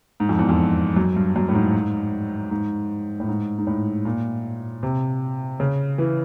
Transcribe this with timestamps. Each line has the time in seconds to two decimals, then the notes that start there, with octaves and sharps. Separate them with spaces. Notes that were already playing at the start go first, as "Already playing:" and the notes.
0.20 G#2
0.29 F2
0.39 E2
0.49 F2
0.97 F#2
1.16 G2
1.36 F#2
1.48 A2
1.55 G#2
2.51 G#2
3.20 A2
3.29 G#2
3.58 G#2
3.67 A2
4.05 A#2
4.83 C3
5.60 C#3
5.98 E3